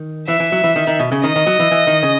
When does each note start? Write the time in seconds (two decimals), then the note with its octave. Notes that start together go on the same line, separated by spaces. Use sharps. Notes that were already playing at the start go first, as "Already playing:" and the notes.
Already playing: D#3
0.28 E3 E5
0.40 E3
0.52 F#3
0.64 E3
0.76 D#3
0.87 D#3
1.00 B2
1.12 C#3
1.23 D#3 D#5
1.36 D#3
1.47 F#3
1.60 E3
1.71 E3
1.87 D#3
2.03 C#3